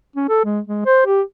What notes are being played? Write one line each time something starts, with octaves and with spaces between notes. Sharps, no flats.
C#4
A4
G#3
G#3
C5
G4